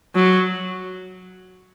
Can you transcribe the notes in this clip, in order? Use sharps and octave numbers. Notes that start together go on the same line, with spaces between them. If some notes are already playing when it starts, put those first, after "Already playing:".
F#3